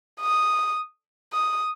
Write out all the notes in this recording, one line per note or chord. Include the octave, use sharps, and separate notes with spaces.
D#6
D#6